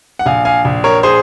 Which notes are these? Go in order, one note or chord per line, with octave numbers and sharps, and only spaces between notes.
F#5
A#1 F5 G#5
F5 G#5
A#1
A#4 C#5
G#4 C5